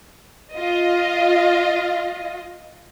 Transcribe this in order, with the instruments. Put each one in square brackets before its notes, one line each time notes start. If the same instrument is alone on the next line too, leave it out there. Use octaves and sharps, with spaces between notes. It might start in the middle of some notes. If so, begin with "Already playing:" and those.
[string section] F4 D#5